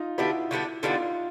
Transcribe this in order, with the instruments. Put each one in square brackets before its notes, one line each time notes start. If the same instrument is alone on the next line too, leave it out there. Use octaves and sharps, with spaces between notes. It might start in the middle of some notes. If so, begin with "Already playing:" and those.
Already playing: [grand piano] D#4 F4
[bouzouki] D3 G3 B3 D4 [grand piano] E4 F#4
[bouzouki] D3 G3 B3 D4
[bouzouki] D3 G3 B3 D4 [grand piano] D#4 F4